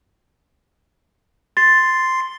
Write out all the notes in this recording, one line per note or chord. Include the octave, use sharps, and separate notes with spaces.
C6 A6 C7